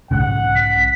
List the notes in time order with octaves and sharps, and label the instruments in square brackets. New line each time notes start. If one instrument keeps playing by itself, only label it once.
[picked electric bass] B1 G#2 C#3 [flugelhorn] F#5
[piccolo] B6